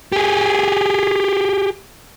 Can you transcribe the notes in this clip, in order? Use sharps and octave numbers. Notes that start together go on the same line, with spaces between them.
G4 G#4